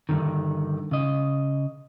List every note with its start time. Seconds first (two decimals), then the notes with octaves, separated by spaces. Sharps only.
0.09 G2 B2 D3 D#3
0.91 C#3 D#5